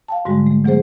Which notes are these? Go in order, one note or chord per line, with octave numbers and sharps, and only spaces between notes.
F5 G5 A5
G#2 D3 G3 G#3 F#4
A3
E3 F#3 B3 G#4 C5